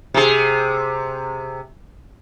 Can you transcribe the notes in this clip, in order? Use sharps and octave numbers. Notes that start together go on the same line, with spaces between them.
C3 G#4